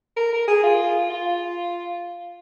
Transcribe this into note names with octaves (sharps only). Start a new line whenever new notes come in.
A#4
A#4
G#4
F4
F4